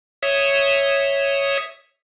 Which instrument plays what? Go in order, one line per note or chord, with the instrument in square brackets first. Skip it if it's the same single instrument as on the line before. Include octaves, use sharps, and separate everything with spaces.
[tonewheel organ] C#5 E5 D#6